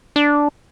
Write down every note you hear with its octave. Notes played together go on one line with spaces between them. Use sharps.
D4